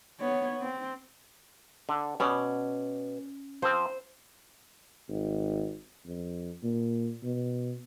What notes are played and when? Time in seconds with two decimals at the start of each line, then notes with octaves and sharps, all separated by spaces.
0.21 B3 C#5
0.62 C4
1.89 D3
2.20 B2 C#4 D5
3.62 F3 C4 C5
5.09 G#1
6.06 F2
6.63 A#2
7.23 B2